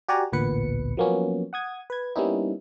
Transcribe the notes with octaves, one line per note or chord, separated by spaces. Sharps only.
F#4 G4 D5 F#5 G#5 A#5
A1 D2 A#2 B3 B4 C#7
F3 F#3 A#3 B3 C#4
F#5 D#6 G#6
B4 G#6
G3 A#3 B3 C#4 D#4 E4